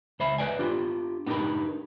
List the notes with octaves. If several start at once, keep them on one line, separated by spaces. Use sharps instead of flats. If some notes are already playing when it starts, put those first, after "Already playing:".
C#2 C5 E5 B5
B4 C5 D5 G#5
D4 F4 G4
B3 D4 D#4 G4 A#4 B4